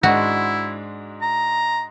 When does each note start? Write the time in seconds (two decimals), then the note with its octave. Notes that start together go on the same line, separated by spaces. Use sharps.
0.03 G#2 G#3 D4 E4 F#4
1.22 A#5